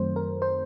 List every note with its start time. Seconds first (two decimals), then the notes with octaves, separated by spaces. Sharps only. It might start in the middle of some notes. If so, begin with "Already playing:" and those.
Already playing: F#2 D#3 F#3 A3 C4 C5
0.16 A#4
0.42 C5